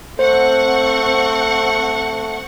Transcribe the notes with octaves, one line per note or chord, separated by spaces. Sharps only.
A3 C4 C5 F#5 C#6